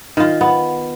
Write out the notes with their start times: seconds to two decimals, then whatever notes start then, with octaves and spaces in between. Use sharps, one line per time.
0.17 D#3 F4
0.41 B3